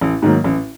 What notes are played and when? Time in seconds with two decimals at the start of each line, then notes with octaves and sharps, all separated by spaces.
0.01 A1
0.22 G#2 D#3 F#3 A#3
0.44 A1